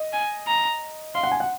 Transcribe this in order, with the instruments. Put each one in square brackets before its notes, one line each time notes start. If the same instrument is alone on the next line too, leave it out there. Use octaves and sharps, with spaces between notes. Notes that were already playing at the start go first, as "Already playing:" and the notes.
Already playing: [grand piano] D#5
[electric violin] G#5
A#5
[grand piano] F5 [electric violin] C6
[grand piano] F#5
G#5
F#5